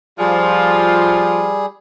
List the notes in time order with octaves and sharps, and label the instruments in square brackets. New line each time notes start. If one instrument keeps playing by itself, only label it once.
[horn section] F3 F4 [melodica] G3 G#4